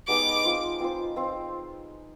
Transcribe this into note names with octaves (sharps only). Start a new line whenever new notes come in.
G#3 B3 D#4 G4 D6
C4 F4 C5
C4 F4 C5
C4 F4 C5